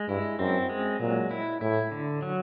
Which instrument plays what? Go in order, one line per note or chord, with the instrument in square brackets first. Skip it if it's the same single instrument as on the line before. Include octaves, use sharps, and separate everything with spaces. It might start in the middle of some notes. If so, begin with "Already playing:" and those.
Already playing: [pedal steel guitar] G#3
[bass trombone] G2 [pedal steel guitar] E4
[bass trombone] F#2 [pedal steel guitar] C4
[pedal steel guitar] G#3
[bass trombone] A#2 [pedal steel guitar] F#3
[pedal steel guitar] E4
[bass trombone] A2 [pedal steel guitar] E4
[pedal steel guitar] D3
F#3